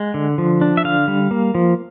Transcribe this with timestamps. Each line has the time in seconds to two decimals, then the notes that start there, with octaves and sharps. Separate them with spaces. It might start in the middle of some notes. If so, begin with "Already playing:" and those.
Already playing: G#3 F#5
0.14 D3
0.38 F3
0.61 D4
0.77 E5
0.84 D3 F5
1.08 G3
1.31 A#3
1.55 F3